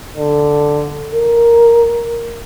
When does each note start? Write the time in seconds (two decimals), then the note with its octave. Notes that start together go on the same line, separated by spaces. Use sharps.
0.16 D3
1.15 A#4